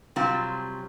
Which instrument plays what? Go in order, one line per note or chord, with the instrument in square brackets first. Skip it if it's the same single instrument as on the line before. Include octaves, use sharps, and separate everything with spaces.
[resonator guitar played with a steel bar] C3 F#3 G3 C4 F4